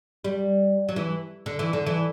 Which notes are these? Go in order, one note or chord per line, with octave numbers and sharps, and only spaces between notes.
G3
F#3
E3
D3
E3
D3
E3